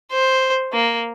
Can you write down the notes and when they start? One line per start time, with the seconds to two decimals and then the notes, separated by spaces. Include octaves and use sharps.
0.11 C5
0.73 A#3